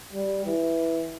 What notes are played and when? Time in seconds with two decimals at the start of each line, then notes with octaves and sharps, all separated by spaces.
0.13 G3
0.45 E3